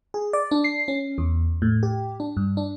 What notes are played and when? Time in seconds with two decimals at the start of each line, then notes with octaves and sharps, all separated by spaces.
0.14 G#4
0.33 D5
0.51 D4
0.64 C7
0.88 C#4
1.18 E2
1.62 A2
1.83 G4
2.20 D4
2.37 G2
2.57 D4